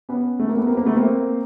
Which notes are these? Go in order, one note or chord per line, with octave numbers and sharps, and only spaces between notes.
B3 C#4
A3
A#3
B3
A#3 C4
A#3
A3 B3
A#3 C4